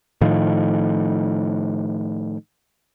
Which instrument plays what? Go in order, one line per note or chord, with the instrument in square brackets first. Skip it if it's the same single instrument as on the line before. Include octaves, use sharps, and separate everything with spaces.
[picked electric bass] A2 D#3 F3